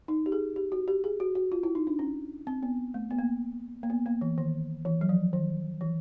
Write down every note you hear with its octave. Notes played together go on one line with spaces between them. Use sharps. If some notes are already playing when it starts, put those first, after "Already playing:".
D#4
G4
G#4
G4
F#4
G4
G#4
F#4
F#4
F4
E4
D#4
D4
C#4
C4
B3
A3
B3
A#3
A#3
B3
A#3
E3
D#3
E3
F#3
F3
D#3
E3